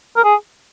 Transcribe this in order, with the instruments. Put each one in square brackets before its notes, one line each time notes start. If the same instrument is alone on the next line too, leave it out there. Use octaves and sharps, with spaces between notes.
[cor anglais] A#4
G#4